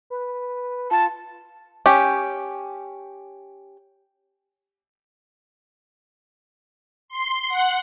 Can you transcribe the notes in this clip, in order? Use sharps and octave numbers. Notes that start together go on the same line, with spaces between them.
B4
F4 A5
C#4 G4
C6
F#5